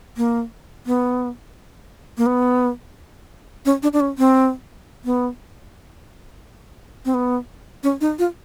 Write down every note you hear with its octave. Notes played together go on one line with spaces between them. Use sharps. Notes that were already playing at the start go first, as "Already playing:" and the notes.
A#3
B3
A#3
B3
C#4
D4
D4
C#4
C4
B3
C4
B3
C#4
D#4
F4